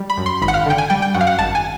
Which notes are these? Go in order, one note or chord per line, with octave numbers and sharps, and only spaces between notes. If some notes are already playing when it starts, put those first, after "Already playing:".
Already playing: G3
B5
F#2
C6
G#1 B5
F#5
F5
D3 G5
G#5
G3 G5
G5
F#2 F#5
F5
F#5
G#1 A5
G#5